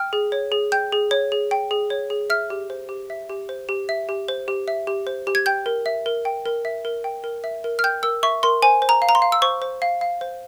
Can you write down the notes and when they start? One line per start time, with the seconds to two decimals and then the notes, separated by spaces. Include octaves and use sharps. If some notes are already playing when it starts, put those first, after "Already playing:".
Already playing: G5 F6
0.13 G#4
0.32 C#5
0.52 G#4
0.72 G5 G6
0.92 G#4
1.11 C#5
1.32 G#4
1.51 G5
1.71 G#4
1.90 C#5
2.10 G#4
2.30 E5 F6
2.50 G4
2.70 C5
2.89 G4
3.10 E5
3.29 G4
3.49 C5
3.69 G4
3.89 E5
4.09 G4
4.28 C5
4.48 G4
4.68 E5
4.87 G4
5.07 C5
5.27 G4
5.35 G#6
5.46 G5 G6
5.66 A#4
5.86 E5
6.06 A#4
6.25 G5
6.46 A#4
6.65 E5
6.85 A#4
7.04 G5
7.24 A#4
7.44 E5
7.64 A#4
7.79 F6
7.84 G5 G6
8.03 A#4 E6
8.23 E5 C#6
8.43 A#4 C6
8.62 C5 G#5
8.82 C5
8.89 A#5
9.02 F5
9.09 A#5
9.15 C6
9.22 F5
9.32 E6
9.42 C5 C#6
9.62 C5
9.82 F5
10.01 F5
10.21 C5